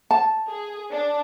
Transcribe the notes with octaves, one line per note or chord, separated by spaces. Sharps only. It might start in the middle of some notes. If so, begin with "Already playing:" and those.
A5
G#4
D4